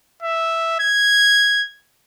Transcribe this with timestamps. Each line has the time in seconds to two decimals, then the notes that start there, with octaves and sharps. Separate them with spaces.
0.23 E5
0.80 G#6